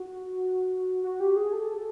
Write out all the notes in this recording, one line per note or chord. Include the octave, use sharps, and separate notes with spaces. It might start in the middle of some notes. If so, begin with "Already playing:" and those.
Already playing: F#4
F#4
G4
G#4
A4